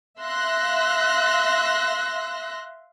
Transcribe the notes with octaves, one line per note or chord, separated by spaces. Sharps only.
E5 F5 C6 E6 F#6 A#6